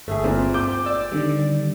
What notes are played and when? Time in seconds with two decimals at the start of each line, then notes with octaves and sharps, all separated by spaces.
0.08 G1 A3 G#4 E5
0.24 A#2 C4
0.54 G5 D6 G6
0.86 D5 E6
1.12 D3 D#3 G3